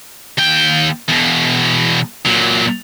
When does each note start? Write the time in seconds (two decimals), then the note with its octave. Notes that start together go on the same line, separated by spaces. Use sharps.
0.38 D#2 G5
1.09 E2 B2
2.25 A#2 F#3